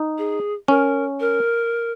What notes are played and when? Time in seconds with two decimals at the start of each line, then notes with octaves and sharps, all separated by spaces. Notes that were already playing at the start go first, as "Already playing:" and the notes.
Already playing: D#4
0.18 G#4
0.68 C#4 A#4
1.20 A#4